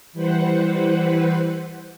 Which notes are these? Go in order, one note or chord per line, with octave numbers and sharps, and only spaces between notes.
E3 G3 B4 C5 F#5